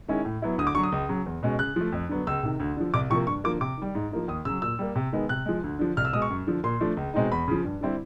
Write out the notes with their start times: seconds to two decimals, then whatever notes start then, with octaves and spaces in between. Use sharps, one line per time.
0.08 D#3 G#3 C#4 E4
0.25 A2
0.42 F#3 B3 E4
0.58 D2 D#6
0.67 D6
0.75 D3 F#3 C#6
0.83 D#6
0.92 C#2
1.09 C#3 F#3
1.26 E2
1.43 B2 G#3 C#4
1.59 C#3 F#6
1.76 F3 A3
1.92 F2
2.09 D3 F#3 B3
2.27 C#2 E6
2.43 C3 D#3
2.60 D2
2.77 D3 F3
2.94 C2 D6
3.10 C3 F3 A#3 C#6
3.27 G2 C#6
3.44 D3 F3 A#3 D6
3.61 C3 D6
3.77 D#3 G3
3.95 G#2
4.12 F3 A#3 D#4
4.28 D#2 D#6
4.45 C#3 E6
4.49 F#3
4.62 A#2 E6
4.79 G3 A#3
4.96 C3
5.13 D#3 G#3 B3
5.29 C3 F#6
5.46 F3 G#3
5.63 D2
5.79 D3 F3
5.97 C2 F6
6.05 E6
6.13 B2 G#3 D#6
6.22 C#6
6.30 F#2
6.47 D3 F3
6.64 A#2 C6
6.80 F3 A3 D4
6.97 C#2
7.14 B2 G#3 C4 D#4
7.32 E2 B5
7.48 C#3 F3
7.64 G2
7.81 D3 G3 C4 E4